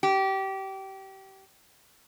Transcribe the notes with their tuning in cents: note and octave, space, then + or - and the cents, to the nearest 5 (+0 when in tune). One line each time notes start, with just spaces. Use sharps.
G4 -25